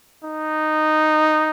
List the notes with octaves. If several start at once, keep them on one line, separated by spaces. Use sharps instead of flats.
D#4